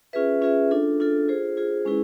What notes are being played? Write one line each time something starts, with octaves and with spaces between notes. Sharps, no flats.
C#4 F4 G#4 B4 E5
C#4 F4 G#4 B4 E5
D4 F4 A4
D4 F4 A4
F4 G#4 C5
F4 G#4 C5
G#3 C#4 E4 G#4 B4